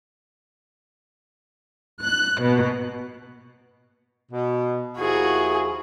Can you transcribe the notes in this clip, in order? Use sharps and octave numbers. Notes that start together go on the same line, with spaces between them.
F#6
B2
B2
D#2 F3 E4 F#4 G#4